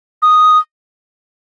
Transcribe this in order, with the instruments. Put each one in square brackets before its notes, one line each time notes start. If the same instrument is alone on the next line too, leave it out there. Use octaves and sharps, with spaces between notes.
[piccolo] D#6